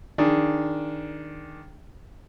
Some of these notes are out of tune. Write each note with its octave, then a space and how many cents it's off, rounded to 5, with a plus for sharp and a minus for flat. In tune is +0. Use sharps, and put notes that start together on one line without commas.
D#3 +0 D4 -5 G#4 +0